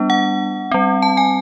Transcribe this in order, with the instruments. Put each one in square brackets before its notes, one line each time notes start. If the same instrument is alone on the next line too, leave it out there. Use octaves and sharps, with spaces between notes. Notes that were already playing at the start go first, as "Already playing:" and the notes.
Already playing: [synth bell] G3 B3 D4
F#5
G3 C4
A5
G#5